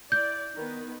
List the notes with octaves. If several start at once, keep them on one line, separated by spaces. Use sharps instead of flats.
E4 D5 G6
D#3 B3 B4